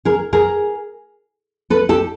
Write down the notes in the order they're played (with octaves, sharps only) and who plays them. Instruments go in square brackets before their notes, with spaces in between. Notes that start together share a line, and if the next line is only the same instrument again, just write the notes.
[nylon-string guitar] G#4 A#4
G#4 A#4
A4 B4
G4 A4